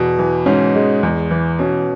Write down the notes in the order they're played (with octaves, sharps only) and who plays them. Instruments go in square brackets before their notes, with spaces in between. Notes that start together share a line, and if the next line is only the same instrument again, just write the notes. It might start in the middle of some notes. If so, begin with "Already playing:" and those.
Already playing: [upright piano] E2 [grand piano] B2
[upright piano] E3
[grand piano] G#2 [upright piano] C#4
[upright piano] G#3
E2
E3
[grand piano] B2 [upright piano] C#4